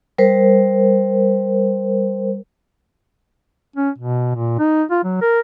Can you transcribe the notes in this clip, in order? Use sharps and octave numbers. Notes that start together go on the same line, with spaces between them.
G3 A#4 C5
C#4
B2
A#2
D#4
F4
F#3
A#4